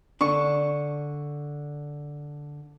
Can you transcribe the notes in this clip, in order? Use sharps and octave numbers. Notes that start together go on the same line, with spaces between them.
D3 D4 C#6